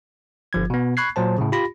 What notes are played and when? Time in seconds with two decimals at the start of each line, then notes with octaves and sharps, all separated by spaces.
0.53 G1 F3 G#6
0.70 B2 B3
0.97 B5 C#6 F#6 G#6 C7
1.16 A#2 F#3 C5 A5
1.38 A2 C#3
1.52 F4 G4 B5 A#6